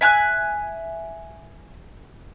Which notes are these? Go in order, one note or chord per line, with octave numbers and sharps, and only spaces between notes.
E5 G#5 F6 F#6